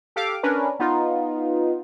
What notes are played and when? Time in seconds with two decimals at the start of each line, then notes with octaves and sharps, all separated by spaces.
0.16 G4 A4 F5 D6
0.43 C#4 D4 A#4 B4
0.79 B3 D#4 F4